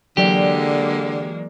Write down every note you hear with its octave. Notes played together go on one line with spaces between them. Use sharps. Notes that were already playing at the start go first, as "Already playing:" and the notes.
D3 E3 F#3 G#3 A#3 G4 D5